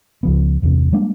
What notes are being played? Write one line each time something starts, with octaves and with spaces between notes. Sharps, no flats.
C#2 F3 B3
A1 E2 G2 C3
G3 G#3 A#3 D4